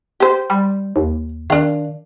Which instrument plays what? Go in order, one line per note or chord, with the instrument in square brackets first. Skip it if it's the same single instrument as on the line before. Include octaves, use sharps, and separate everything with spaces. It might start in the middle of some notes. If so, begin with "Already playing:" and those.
[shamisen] G4 C5
[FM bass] G3
D#2
[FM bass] D#3 [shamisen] D4 F5